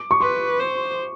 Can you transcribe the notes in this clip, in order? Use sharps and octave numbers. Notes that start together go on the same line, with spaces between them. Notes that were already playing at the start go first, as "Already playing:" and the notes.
Already playing: D6
C#6
B4 C6
C5